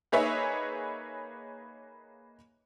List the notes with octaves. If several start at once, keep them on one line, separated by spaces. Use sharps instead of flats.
A#3 D#4 G#4 B4 C#5 E5